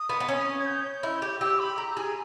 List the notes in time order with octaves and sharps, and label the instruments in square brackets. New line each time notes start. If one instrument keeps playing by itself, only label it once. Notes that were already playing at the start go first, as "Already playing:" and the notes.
Already playing: [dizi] D#6
[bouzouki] B3
B3
C#4
[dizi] G#6
G6
[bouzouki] E4
G4
[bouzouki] G4 [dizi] E6
[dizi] B5
[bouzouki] G4 [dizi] A#5
[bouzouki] G#4 [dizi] G#5